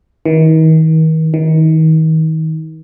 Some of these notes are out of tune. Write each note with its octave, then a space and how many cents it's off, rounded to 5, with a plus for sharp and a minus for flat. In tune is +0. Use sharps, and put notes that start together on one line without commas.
D#3 +40
D#3 +35